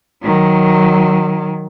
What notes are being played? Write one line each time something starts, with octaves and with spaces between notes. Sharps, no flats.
D#3 F#3